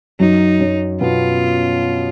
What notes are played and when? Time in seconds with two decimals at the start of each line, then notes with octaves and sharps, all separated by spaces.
0.20 F#2 F#3 D#4
0.60 F#2 F#3
1.01 B2 B3 F4